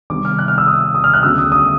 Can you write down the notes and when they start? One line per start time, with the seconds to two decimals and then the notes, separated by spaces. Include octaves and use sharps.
0.10 C3 D#3 G3 B3 D6
0.25 F6
0.39 F#6
0.48 F6
0.58 E6
0.67 D#6
0.95 D#6
1.04 F6
1.14 F#6
1.23 D2 C#3 F#3 B3 D4 E6
1.38 D#6
1.52 D#6